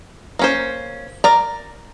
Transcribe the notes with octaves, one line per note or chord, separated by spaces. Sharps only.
A#3 C#4 C5
A#4 D5 A#5